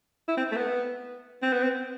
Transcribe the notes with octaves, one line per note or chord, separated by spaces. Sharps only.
E4
C4
A3
B3
C4
B3
C4